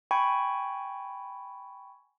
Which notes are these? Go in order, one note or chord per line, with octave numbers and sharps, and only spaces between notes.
G5 G#5 B5 C#6 G#6